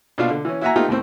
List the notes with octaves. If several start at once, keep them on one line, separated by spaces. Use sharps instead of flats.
B2 D4 F4 F5
D3
E3 C#4
E4 F#4 E5 F#5 G#5 A#5
A3 B3 D#4 F4 G4
D#2 A2 C4